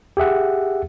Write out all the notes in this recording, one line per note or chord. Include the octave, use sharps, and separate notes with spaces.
G4 G#4 E5 F#5